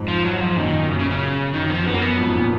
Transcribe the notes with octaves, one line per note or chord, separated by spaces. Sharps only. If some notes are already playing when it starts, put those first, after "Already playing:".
Already playing: F2 G#2
F3
F#3
F3
F#2 A#2 D#3
B2
F#2 A#2 C#3
C#3
C#3
F#2 D#3
F2 F3
F#2 B3
A#3
B3
F2 G#2
A#2